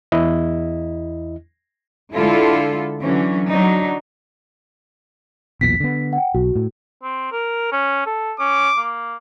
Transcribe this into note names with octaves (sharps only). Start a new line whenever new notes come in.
E2 E4 D#5
D3 G#3 E4 F4 A4
D3 E3 F#3 C#4
F#3 D4 D#4
B1 E2 A#2 B6
D3 B3
F#5 G5
B1 F#4
A2
C4
A#4
C#4
A4
C#4 D6
A#3